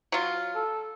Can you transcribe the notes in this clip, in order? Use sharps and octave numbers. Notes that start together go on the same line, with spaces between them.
F#3 F4
A4